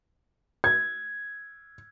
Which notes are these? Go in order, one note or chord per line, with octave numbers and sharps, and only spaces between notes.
G#6